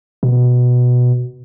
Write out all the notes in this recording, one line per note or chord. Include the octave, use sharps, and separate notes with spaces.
B2